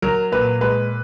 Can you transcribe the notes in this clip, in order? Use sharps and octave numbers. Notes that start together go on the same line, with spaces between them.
F#3 A#4
A#2 B4
G#3 B4